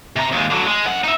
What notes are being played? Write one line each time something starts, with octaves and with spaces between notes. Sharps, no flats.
C3 A#5
D#2 G#3
D3 F#3
G#3
F#2 F#5
D#4 E5